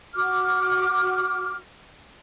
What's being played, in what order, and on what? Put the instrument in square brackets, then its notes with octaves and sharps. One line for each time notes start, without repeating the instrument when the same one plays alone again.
[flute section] F#4 D6 F6